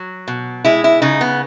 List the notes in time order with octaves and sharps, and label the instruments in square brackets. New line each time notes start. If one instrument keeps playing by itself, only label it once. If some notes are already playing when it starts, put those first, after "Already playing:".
Already playing: [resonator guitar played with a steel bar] F#3
B2
G#3 E4
E4
C#3 D#4
B3